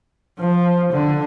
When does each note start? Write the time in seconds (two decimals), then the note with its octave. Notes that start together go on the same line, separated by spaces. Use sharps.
0.39 F3
0.92 D3